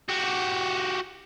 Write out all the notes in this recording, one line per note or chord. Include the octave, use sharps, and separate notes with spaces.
F#4 G4